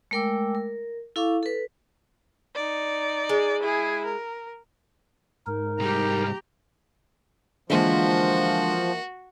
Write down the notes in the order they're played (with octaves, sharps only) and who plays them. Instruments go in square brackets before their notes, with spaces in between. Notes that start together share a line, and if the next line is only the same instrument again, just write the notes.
[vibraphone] G#3 A3 A#4 G5 D6 E6
A#4
E4 A4 F5 C#6 D6
A4 B4
[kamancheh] D#4 D5
[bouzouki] G#3
[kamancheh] E4 G#4
A#4
[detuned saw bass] G#2 [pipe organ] D#4 A#4
[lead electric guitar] C2 G3 [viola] G4 A#5
[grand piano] D3 G#3 [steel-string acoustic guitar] E3 A#3 E5 [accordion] F3 [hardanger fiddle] F#4